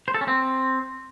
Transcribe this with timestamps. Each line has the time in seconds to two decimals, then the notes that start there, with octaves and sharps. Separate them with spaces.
0.08 C5
0.14 A4
0.21 C#4
0.28 C4